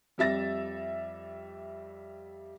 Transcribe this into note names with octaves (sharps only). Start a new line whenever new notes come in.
F2 G3 E5 A6 A#6